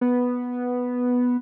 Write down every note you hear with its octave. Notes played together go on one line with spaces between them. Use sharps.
B3